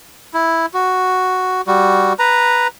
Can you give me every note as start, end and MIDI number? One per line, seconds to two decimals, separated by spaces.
0.34 0.66 64
0.74 1.61 66
1.67 2.13 55
1.67 2.13 66
2.19 2.67 71
2.19 2.67 82